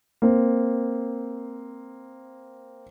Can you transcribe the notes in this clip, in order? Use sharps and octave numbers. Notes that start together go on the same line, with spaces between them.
A#3 C4